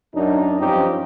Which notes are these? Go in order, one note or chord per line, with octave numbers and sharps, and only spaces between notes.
F#2 D4 D#4
G2 F3 C4 C#4 D#4 G4